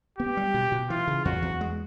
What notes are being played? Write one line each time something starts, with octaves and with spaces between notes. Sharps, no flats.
B3 G4
G3
B2
B2
E3 F4
C#3
E2 F#4
E2
G#3